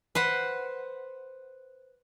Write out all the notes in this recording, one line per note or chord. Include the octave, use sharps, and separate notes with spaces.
B4 C5 F#5